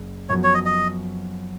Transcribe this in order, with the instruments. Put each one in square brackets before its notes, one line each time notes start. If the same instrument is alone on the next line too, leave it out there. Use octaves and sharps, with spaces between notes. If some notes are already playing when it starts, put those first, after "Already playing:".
Already playing: [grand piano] F#1 F#2
[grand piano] F#2 F3 B3 F#4 [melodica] C#5
[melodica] C#5
D#5
D#5